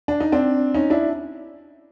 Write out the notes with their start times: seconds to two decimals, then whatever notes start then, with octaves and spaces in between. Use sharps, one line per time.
0.08 D4
0.20 D#4
0.32 C4 D4
0.74 C#4 D#4
0.90 D4 E4